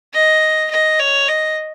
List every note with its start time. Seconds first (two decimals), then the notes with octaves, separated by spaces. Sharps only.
0.13 D#5
0.70 D#5
0.99 C#5
1.28 D#5